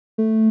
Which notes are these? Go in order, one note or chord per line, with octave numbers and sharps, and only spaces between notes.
A3